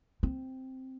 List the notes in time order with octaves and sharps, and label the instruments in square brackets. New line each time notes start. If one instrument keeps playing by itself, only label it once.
[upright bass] C4